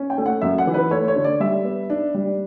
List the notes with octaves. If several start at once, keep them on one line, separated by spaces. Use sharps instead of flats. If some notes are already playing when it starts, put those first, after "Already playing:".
Already playing: C#4
G5
A3
F#5
F#2 E5
F#5
E3
B4
A3 C#5
C#5
D3
D5
G3 E5
B3
D4
G3